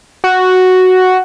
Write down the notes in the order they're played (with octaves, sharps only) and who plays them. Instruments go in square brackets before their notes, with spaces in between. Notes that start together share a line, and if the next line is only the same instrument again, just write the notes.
[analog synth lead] F#4